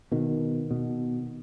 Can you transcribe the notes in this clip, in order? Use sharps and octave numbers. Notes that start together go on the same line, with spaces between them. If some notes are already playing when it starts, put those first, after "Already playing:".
B2 D#3
B2